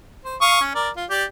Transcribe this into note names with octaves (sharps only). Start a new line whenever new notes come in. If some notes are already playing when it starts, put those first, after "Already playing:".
C5
F5 C#6 D#6
C#4
A#4 D5
F4
G4 D5